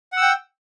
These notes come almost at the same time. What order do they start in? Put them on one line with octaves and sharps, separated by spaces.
F#5 E6 G5